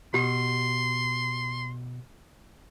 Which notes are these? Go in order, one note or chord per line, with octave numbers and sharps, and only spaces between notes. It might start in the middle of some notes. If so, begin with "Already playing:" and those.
B2 G4 C6